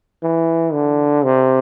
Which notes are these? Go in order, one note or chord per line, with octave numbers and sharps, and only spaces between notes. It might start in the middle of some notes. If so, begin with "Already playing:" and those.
E3
D3
C3